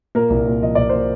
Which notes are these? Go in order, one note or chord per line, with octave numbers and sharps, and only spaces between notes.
A#2 A#3 A#4
C2
A#2
F3 D#5
C2 D5
A#2 C5